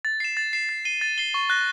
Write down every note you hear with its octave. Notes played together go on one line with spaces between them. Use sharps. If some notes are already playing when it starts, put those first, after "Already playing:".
A6
C7 E7
A6
C7 E7
A6
C7 D#7 G7
A6
C7 D#7 G7
C#6
F#6 A#6